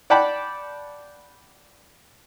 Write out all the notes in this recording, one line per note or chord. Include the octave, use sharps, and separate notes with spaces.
D5 F#5 G5 A5 B5